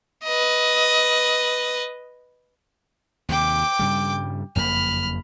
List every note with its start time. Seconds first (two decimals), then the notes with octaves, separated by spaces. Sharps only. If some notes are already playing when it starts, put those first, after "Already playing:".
0.24 B4 D#5
3.29 D#2 C3 G5 D6
3.79 G2 C#3 G3
4.55 F#1 F2 A#3 B5 F6